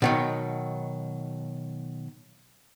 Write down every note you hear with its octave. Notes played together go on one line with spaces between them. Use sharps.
B2 D#3 F#3